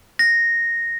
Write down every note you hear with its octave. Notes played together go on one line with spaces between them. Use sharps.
A#6